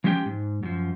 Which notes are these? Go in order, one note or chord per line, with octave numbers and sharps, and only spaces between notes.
F3 G#3 C#4 G4 E5 G5
G#2
F#2 F3